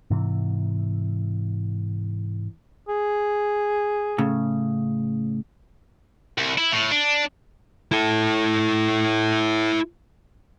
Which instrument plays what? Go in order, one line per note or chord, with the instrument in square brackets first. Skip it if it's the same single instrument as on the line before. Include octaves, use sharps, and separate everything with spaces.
[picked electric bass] G#2 C3 E3
[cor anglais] G#4
[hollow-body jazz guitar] A2 C#3
[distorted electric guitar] C2
E4
A2
D4
E4 A4